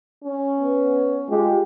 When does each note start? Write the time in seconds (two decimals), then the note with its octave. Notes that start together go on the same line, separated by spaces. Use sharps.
0.24 C#4
0.60 B3
1.30 G#3 F4 G4